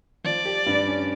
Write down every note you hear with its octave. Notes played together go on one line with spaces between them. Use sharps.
F3 D5
G4
G2
C#4